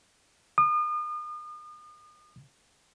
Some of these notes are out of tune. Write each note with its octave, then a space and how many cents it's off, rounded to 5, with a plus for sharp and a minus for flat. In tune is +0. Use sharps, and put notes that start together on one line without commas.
D#6 -40